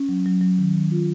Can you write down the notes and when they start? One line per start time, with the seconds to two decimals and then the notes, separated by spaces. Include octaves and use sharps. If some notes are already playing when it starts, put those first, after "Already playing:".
Already playing: C#4
0.09 F#3
0.26 F#3
0.41 F#3
0.59 D#3
0.75 D#3
0.91 F4